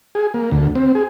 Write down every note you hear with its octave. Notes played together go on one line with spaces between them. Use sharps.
G#4
A#3
D2
C4
G#4